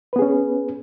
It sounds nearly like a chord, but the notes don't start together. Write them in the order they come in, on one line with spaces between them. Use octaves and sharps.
B4 B3 G#4 C#4